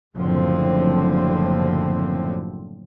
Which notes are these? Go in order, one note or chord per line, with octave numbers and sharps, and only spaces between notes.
F#1 F#2 A2 D3 F3 C4